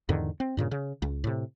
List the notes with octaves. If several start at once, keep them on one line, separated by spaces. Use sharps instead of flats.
E2 G#2 D3 D#3
C4
G2 A#2 C#3
C#3
C#2
A2 C3